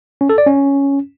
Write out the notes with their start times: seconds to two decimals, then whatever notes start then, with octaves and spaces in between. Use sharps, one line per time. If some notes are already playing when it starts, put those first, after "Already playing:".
0.21 C#4
0.29 A4
0.38 D5
0.47 C#4